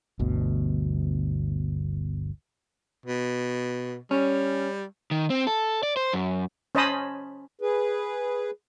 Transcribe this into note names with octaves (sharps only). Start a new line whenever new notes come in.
G1 D2 B2
B2
G3 C#4
D#3
C4
A4
D5
C5
F#2
C#4 C5 D#5 A5 B5 D#6
G#4 B4